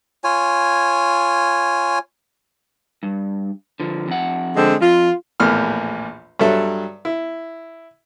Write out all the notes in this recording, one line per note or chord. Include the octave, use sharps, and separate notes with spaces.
F4 C#5 G#5
G2
D3 F3
F2 F#5
D3 G#3 C4
F2 F4
A#1 E2 A2 F6
G2 F#3 A4 E5
E4